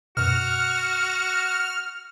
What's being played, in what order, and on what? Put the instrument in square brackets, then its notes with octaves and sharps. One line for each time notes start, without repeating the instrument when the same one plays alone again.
[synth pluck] F#2 B2 [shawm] F#4 [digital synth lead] F6